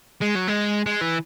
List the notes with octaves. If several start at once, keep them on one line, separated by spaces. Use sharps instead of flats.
G#3
F#3
G#3
G#3
E3